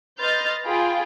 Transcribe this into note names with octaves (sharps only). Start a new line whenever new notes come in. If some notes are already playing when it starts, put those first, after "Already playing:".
B4 D#5 C6 F6 G6 A6
F4 G#4 G5 B5